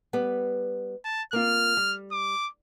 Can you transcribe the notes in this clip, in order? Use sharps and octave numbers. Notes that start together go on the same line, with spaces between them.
G3 B3
A5
A#3 C4 F4 F6
G3
D6